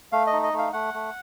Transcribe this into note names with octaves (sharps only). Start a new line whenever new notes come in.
A3 F5
D#5
D#4
D#5
A3
F5
A3 F#5
A3